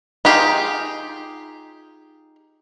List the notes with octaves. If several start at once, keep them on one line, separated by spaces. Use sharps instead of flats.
D#4 F4 G4 G#4